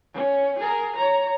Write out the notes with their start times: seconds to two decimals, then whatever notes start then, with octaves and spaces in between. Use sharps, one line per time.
0.14 C#4
0.59 G#4 A#4
0.96 C#5 A#5